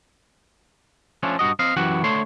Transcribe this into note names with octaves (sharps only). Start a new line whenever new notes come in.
F3 A3 C#4 D4
G2 F#4 D#5
C4 D#5 F5
F#2 E3 F#4 G4 F#5
D3 A3 C#5 C6